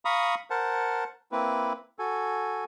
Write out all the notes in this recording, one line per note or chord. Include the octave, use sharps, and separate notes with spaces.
F5 A#5 B5 C#6 D#6
A#4 C5 F#5 A5
A#3 C4 E4 B4
F#4 A4 G#5